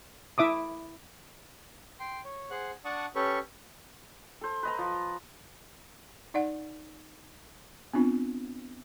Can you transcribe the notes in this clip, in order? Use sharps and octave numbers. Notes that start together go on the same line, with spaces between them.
E4 E5 D6 D#6
G5 C6
C#5
G#4 C5 F#5 F#6
D4 D5 F#5 A5 C#6 D#6
C#4 G4 A4 B4 C#5 C#6
A4 C5
B4 D#5 A#5
F3
D#4 D5 F#5
B3 C4 D4 F4